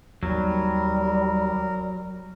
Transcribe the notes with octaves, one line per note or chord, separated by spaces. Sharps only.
D#2 F#3 G3 A#4